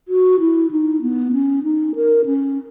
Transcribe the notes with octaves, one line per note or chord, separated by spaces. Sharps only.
F#4
E4
D#4
B3
C#4
D#4
A#4
C#4